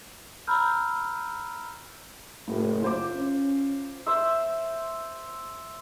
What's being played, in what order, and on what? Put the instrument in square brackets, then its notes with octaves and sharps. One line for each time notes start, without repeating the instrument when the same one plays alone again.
[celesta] A#5 B5 E6 F6 G6
[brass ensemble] F#1 [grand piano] A2
[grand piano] F4 C5 D6
[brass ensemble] C#4
[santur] C5 E5